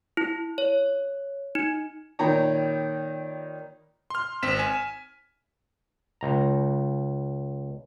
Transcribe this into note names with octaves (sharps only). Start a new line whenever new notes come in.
E4
C#5
D#4
A#2 D#3 C#5 G5 A#5 B5
C6 F6
G#1 C4 B6 E7
G#5
C#2 A#5